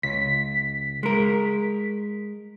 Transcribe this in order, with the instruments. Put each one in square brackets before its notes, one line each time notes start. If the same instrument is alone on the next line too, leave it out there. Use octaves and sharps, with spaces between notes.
[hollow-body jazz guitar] C#2 [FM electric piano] B6
[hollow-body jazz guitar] G#3 A#4